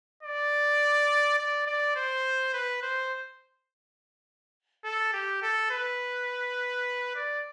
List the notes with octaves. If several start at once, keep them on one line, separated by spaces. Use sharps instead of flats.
D5
D5
D5
C5
B4
C5
A4
G4
A4
B4
D5